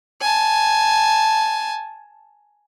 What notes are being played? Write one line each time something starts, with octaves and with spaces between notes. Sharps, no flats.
G#5 A5